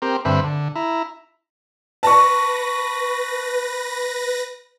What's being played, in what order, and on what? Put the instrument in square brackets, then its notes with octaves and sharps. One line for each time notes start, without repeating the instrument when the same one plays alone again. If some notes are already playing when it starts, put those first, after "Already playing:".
[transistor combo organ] C4 G4 A#4
G2 D3 C4 B4 E5
D3
E4 A#5
[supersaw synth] B4 A#6 [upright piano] A5 C#6